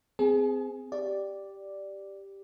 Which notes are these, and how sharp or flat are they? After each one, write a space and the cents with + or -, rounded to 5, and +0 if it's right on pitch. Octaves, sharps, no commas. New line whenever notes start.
C4 -25 G#4 +0 G#5 +45
G4 +0 D5 +0